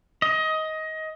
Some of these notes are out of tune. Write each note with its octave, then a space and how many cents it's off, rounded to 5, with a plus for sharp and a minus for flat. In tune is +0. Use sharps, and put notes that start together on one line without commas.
D#5 +20